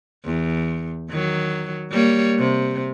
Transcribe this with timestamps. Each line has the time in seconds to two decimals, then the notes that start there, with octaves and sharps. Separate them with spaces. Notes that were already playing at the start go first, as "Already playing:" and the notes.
0.25 E2
1.10 D#3 F#3
1.91 G3 A#3 C#5
2.38 C3